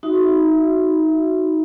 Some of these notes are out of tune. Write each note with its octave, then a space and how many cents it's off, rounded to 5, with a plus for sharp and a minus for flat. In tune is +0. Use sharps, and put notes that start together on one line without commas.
D#4 +15 F#4 +0 E5 +0